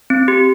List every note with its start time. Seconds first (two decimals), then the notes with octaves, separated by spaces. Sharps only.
0.10 C4
0.28 G4